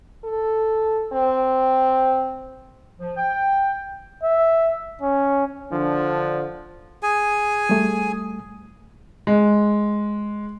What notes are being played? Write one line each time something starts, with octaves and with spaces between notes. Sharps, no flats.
A4
C4
F3
G5
E5
C#4
D3 F3 D4
G#4 G#5
G3 A3
G#3